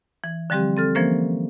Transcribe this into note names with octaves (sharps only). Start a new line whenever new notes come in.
E3
D3 F3 G3 C4 G4
C4 A4 F6
E3 F3 A#3 C#4 A#4 C5